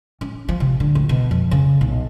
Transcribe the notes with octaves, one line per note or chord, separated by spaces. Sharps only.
C#4
F3
C3
D3
D2
B2
F2
C#3
B1